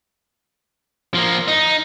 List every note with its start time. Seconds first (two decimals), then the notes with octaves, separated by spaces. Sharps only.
1.14 F3 A#3
1.48 D#4